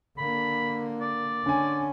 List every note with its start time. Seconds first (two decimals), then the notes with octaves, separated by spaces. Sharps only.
0.18 D3 A#3 B5
1.01 D5
1.46 D3 C#4 G#5